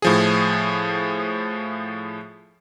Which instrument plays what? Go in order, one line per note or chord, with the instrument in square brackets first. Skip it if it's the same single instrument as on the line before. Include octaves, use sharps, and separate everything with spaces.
[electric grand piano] A2 F3 G#4